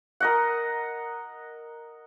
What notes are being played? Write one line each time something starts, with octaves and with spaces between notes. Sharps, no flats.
A#4 D#5 F#5